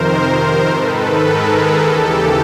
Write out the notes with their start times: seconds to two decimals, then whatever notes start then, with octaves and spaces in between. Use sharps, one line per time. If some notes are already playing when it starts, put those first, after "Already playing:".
Already playing: F2 C3 D#3 A#4 C5
0.67 G#2 D#3 A4 B4
1.23 G#4 A#4
1.78 D#2 C#3 E3 G4 A4